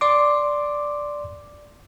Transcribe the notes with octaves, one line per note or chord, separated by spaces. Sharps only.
D5 C6 D6